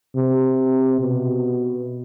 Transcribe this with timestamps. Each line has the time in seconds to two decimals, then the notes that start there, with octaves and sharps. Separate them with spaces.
0.16 C3
1.01 B2